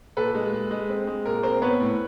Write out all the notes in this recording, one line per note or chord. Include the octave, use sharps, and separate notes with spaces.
A#2 A4 B4
G#3
G#3
G#3
C4
G#3
A#2 A#4
C4 A#4 C5
B3 B4 C#5
A2